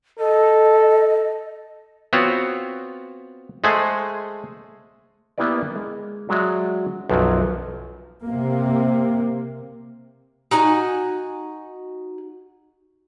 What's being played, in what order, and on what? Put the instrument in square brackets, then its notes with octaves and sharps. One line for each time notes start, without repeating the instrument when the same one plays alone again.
[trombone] A4 [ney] D#5
[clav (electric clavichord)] B3 C4 F4 F#4 C#5
G#3 A3 G#4 C5 F#5 G#5
A#3 B3 E4 G4 B4 D5
G#3
F#3 G#3 F#4 D5 E5
B1 F#2 F3 F#3
[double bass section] C3 A#3
[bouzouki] D#4 F#4 G#5